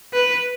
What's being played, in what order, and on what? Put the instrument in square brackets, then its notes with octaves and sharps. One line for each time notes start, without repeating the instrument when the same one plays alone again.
[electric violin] B4